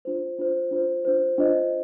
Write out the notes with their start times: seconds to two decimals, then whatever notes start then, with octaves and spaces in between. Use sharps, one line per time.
0.05 D4 F4 C5
0.38 D4 F4 C5
0.71 D4 F4 C5
1.05 D4 F4 C5
1.38 D4 F4 C5 D#5